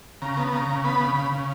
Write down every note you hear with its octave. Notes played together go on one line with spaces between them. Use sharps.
C#3 A#5
B3
C#3 A#5
C#3
B3 B5
C#3
C#3
C#3